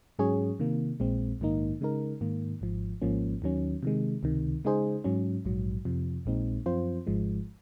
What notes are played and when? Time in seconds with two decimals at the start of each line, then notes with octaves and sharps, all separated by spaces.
0.19 G#2 F#3 C#4 G#4 C#5
0.59 C3 D#3 A#3
1.00 A#1 A#2 G#3 C4
1.40 A#1 G#2 D#3 A#3 D#4
1.81 C#3 G#3 D#4 A#4
2.21 G#2 D#3 A#3
2.61 G#1 G#2 F3
3.02 G#1 G#2 F3 A#3 C#4
3.42 D#2 D#3 F#3 C#4
3.83 C3 D#3 G#3
4.23 C#2 C3 D#3
4.64 C#3 G#3 D#4 G#4 C5
5.04 G#2 F#3 C#4
5.45 A#1 G#2 F#3
5.85 F2 C3 F3
6.25 A#1 A#2 G#3 C4 D#4
6.66 F#2 F3 C4 F4 C5
7.07 G#1 G#2 F3 G#3